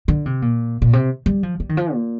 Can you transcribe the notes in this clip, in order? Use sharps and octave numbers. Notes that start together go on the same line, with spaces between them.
D3
C3
A#2
A#2
C3
G3
F3
G3
D#3
F3
A#2